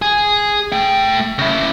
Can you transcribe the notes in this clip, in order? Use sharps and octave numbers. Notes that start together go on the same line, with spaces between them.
G#4
A3 G5
C#3 E4